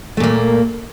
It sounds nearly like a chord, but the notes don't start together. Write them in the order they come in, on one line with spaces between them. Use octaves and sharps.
A3 A#2 A#3